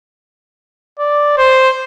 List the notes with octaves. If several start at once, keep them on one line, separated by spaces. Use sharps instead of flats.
D5
C5